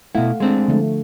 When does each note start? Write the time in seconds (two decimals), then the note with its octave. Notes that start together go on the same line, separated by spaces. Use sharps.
0.15 B2 A3 E4 F5 F#5
0.40 G#3 C4 D4
0.68 D3 F3 A3